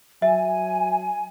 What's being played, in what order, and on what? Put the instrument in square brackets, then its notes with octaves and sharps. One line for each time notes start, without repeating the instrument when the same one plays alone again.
[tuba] F#3 [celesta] E5 [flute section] G#5